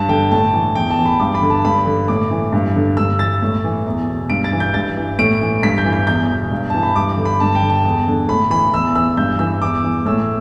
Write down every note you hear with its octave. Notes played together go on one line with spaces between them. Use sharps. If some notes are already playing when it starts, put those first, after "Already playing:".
Already playing: G2 A5
D3 G5
A2 A5
E3
E2 G5
A5
E3
B5
G2 D6
B5
D3
A5
G2 B5
D3
A2 D6
E3
G2
D3
G2 E6
E3 A6
A2
E3
E2
B2
G2 D7
A6
E3
G6
G2 A6
E3
A2 D7
E3
G2 B6
G6
E3
G6
E2 G6
B2
G2
E3 A5
B5
G2 D6
D6
D3
B5
G2 A5
G5
D3
A5
E2
D3
A2 B5
E3 B5
E2 E6
E3 E6
G2 G6
E3 E6
E2 D6
E3
A2 E6